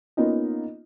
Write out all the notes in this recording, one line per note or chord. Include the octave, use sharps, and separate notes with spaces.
A#3 B3 C#4 D#4 F4 D#5